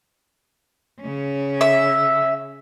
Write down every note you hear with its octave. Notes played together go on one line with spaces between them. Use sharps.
C#3 C#4
E5